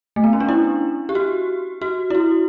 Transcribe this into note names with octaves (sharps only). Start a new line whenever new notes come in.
A3
B3
C#4
D4
E4
G4
F#4
F#4
E4
F#4